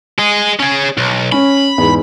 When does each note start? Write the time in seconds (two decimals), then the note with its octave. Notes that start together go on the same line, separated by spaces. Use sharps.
0.19 G#4 D#5
0.60 C#4 G#4
0.98 B1
1.32 C#4 B5
1.78 E2 G#2